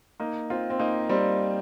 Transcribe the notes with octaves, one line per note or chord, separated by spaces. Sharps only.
A#3 D#4
C4 F4
C4
A#3 D#4
G3 C4